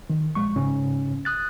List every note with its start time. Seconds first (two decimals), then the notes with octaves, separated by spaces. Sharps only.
0.10 D#3
0.35 A#1 G#3 C#6
0.56 G#2 C#3 C#4
1.25 D#6 F#6 A6